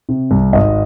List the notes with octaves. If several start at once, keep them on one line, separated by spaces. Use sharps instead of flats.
C3
C2
G#1 D#5